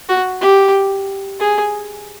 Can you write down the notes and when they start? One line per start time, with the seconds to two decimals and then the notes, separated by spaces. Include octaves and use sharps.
0.09 F#4
0.41 G4
1.40 G#4